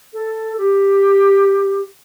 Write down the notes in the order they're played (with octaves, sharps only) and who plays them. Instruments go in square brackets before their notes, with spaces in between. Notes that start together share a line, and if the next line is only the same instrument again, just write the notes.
[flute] A4
G4